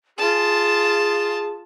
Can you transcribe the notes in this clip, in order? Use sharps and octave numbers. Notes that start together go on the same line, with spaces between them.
F4 G#4 A5